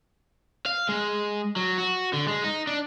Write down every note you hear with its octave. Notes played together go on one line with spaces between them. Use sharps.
F5
G#3
F#3
F#4
D3
G#3
D#4
D4